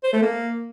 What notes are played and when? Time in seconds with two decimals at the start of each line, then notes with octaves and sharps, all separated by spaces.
0.04 C5
0.13 A3
0.22 A#3